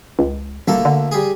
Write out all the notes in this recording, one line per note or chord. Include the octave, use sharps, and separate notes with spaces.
C#2
D#1 D2 A#3 A4
D3
G3 G#4